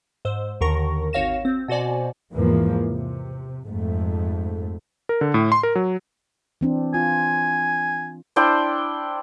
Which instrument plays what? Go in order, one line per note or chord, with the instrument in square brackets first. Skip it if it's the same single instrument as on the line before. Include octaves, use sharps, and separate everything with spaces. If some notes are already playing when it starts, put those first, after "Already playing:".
[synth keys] G#2 C5 E6
D#2 D3 D#3 A#4 C#6 A#6
G#1 F#4 C#5 F5 A#6 E7
C4
B2 F#4 C5 D5 G#5
[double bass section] E2 G#2 E3 F3 A#3
C3
F2 G#2 A3
[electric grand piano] A#4
D3
A2
C6
A#4
F#3
[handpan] E3 C4 D4
[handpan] F4 [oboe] G#5
[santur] D4 E4 C5 G5